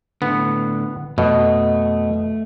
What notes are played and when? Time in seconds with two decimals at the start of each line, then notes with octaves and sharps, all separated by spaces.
0.22 A2 D3 B3
1.18 F2 B2 A3 D#5